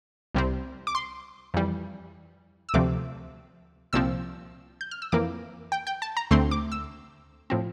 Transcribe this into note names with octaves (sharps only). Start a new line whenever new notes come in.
C2 C3 G3 C4
D6
C6
F2 E3 G3
E6
D2 C3 F3 A3 C4 D6
C2 A#2 F3 C4 E6
G6
F6
E6
F2 E3 A#3 D6
G5
G5
A5
A#5
D2 D3 A3 C4 C6
D6
E6
A2 F3 C4